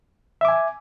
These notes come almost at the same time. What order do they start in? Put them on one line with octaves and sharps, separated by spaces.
E5 D6 G#5